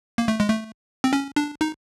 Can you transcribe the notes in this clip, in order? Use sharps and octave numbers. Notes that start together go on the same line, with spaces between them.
A#3
A3
G#3
A3
C4
C#4
D4
D#4